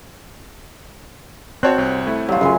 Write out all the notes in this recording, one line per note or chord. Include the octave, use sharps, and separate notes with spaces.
C4 F#4 C5 C#5 A5 F#6
C2
A3 E4
F#3 G3 F4
F#2 C#3 G#5 C6